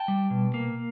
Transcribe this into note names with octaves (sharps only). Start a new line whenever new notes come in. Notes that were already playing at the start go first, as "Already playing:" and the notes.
Already playing: G5 A5
G3
B2
A#3